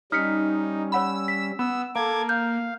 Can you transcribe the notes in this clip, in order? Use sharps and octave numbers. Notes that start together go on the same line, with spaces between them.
G3 C#4 D#4 F6 B6 C#7
C#5 F#5 B5 E6
B6
B3 E6
A#3 A4 D6 G#6
F5 G6